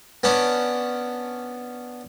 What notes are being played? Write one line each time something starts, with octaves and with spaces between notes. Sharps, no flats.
B3 C#4 D4